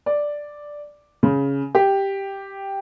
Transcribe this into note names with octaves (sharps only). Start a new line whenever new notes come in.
D5
C#3
G4